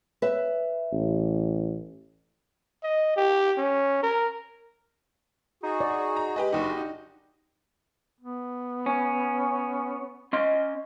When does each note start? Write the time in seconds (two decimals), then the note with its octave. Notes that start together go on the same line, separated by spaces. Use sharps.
0.22 B4 E5
0.92 A1
2.83 D#5
3.16 G4
3.58 C#4
4.03 A#4
5.63 D#4 F#4 G#4
5.81 D5
6.17 A#5
6.36 G#3 G4 B4 D#5
6.52 F#1 D4 D#4 F#4 G4 D#5
6.77 D#4
8.20 B3
8.86 C#4
10.33 C#4 D#5 C6